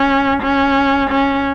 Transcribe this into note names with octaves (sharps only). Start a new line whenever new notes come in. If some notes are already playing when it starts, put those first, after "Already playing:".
Already playing: C#4
C#4
C#4